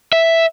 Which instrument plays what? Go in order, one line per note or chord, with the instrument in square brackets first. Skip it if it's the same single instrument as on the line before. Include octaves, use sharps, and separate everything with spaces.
[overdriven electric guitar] E5